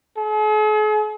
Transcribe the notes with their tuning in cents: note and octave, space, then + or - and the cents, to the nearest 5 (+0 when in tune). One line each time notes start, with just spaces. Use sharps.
G#4 +45